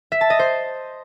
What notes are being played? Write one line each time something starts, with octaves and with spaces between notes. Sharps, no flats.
E5
A5
D#5
C5